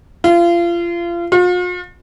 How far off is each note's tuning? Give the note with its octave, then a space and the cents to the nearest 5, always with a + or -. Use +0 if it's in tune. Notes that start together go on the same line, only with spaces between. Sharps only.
F4 -30
F4 +45